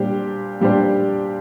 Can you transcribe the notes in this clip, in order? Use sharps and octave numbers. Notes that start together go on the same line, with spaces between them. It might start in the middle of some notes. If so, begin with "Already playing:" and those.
Already playing: A#2 G3 D4 G4 C5
A#2 G3 D4 G4 C5